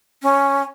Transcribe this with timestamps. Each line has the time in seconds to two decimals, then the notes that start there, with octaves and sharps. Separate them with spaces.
0.22 C#4